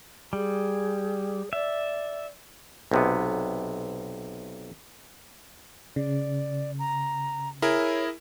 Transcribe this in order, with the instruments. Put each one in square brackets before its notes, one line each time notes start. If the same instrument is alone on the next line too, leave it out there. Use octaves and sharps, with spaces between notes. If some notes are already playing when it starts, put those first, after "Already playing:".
[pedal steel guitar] G3 [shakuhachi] G#4
[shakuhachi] D5 [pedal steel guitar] E5
[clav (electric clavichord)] B1 C3 B3
[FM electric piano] C#3 [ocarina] D5
[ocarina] A#5
[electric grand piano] E4 G#4 A#4 [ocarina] C#5